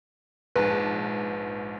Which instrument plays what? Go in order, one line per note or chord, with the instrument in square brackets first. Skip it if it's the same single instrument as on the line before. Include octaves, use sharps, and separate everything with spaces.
[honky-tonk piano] A#1 G#2 A5 [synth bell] B4